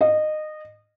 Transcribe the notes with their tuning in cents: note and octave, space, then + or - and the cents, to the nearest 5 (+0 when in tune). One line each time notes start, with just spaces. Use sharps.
D#5 -20